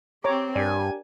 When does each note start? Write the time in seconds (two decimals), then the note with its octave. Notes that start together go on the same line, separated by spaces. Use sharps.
0.24 C4 G4 C#5 A#5 D6
0.56 G2 D4 G4 A#4 D5 G#5